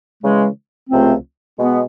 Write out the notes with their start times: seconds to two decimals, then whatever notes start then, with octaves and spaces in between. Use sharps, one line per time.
0.22 C#3 E3 G#3
0.90 C#2 C3 F3 A3 C4
1.58 B2 G#3 B3